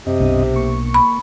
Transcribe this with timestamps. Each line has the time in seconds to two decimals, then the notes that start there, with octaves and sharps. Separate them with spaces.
0.07 F#2 C3 C4 D#5
0.20 B1 B3 D4
0.56 A#3 C#6
0.94 B5